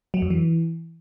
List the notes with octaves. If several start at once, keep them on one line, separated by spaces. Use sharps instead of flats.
F#3
F2
E3